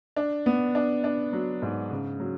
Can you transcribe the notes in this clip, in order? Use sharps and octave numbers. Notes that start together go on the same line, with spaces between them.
D4
B3
D4
D4
F#3
G#2
C#3
F#3